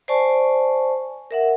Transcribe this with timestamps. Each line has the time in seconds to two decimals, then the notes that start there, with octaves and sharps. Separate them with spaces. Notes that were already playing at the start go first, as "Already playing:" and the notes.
0.08 C5 D5 G#5 A5 C#6
1.31 A#4 E5 F#5